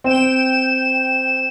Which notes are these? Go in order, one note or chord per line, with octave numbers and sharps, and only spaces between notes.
C4 G5 E7